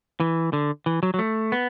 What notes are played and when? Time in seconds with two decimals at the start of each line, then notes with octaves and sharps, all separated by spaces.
0.20 E3
0.53 D3
0.86 E3
1.03 F#3
1.14 F#3
1.19 A3
1.52 B3